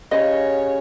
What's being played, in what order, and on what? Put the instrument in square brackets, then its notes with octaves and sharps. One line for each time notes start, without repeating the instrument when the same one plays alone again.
[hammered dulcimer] C#3 [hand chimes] G4 F5 [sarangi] C#5 [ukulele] D#5